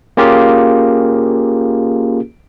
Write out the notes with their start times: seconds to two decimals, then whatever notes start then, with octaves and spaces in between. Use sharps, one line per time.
0.17 A#3 C#4 F4 G4 G#4 A#4